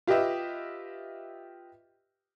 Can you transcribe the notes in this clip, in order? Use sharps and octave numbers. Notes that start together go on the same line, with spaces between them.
F4 G4 B4 D#5 E5